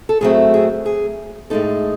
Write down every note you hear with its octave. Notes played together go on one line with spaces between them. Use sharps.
A4
A2 F#3 A3 C4 G#4
G#4
G#4
A2 G#3 D#4 A4